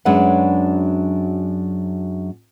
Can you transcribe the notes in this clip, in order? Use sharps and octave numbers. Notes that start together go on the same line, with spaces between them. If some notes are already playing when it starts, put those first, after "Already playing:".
F#2 F#3 G#3 D4 B4 F#5